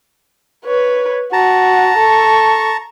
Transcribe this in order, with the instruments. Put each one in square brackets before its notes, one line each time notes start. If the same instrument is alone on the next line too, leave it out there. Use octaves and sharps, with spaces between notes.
[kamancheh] B4 C#5
[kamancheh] F#4 [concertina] A5 A#5
[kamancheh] A4 C#6